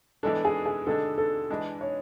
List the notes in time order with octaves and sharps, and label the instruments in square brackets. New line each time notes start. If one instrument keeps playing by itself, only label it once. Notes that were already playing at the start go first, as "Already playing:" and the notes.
[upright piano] E3 G#3 B3 D4 [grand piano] A4
[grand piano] G#4
G#4
[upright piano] D3 G#3 D4 [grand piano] A4
[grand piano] A4
[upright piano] E3 G#3 D4 G#4
[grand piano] C#5